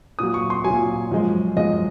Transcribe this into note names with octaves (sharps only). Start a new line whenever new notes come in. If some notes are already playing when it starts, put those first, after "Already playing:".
A#2 F#3 D#6
C#6
C6
F#3 G#5
A#2
F#2 F3 G#3
F#2 F3 G#3 D#5